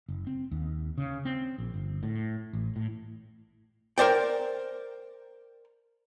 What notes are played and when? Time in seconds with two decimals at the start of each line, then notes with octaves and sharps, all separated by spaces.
0.08 F#1
0.27 C4
0.51 D#2
0.98 C#3
1.25 C4
1.58 A#1
1.74 G1
2.03 A2
2.53 A1
2.76 A2
3.98 A#4 C5 D5 G5